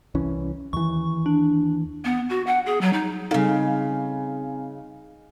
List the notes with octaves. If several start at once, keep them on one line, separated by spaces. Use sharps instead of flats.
C2 E3 C#4
D#2 E3 C#6
D4
B3
F#4
F#5
G#4
F#3
D#4
A#2 C#3 G3 C4 D#4 A4 F5 G#5